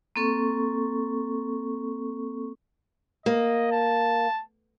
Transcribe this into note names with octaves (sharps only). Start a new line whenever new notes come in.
A#3 C4 A4 C#6
A#3 D#5
A5